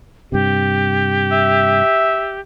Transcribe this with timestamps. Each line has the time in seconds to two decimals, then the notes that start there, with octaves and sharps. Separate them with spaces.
0.32 G2 C3 G4
1.32 E5